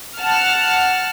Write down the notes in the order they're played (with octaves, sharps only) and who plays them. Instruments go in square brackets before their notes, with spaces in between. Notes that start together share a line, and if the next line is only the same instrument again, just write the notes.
[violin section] F#5 A5 F6